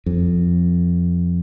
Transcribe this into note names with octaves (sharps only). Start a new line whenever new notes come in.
F2